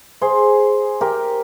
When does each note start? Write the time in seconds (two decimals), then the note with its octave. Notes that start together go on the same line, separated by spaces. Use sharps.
0.21 G#4 C5
1.01 G4 A#4